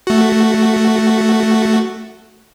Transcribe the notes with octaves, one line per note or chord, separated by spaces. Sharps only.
A3 F#4